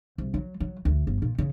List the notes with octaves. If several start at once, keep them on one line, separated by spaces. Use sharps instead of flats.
C2
F#3
F#3
D2
G1
A#2
C#3